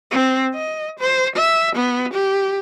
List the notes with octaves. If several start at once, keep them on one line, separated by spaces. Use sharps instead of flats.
C4
D#5
C5
E5
B3
G4